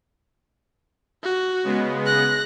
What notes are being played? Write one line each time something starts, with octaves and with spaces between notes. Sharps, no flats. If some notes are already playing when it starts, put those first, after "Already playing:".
F#4
C#3 G#3 B3
F#6 A#6